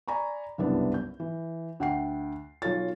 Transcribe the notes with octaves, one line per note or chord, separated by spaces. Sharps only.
D5 G#5 A#5 B5 C#6
F#1 C2 G2 B3 D4 E4
G6
E3
D2 F#5 G5 C7
B1 F4 A4 C#5 A6